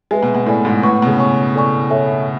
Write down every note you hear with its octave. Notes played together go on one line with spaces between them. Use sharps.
G#3 B4 E5 G#5
B2
B2
A2 A4 D5 G#5
G#2
A2 B4 F#5 C#6
B2
C#3
C#5 G#5 C#6
E4 A4 D5 G#5 C#6
A4 C#5 E5 G#5